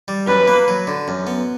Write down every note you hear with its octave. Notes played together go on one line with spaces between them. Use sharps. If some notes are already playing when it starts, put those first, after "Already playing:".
G3
F#2 B4
A#3
F#3
D3
F#2
B3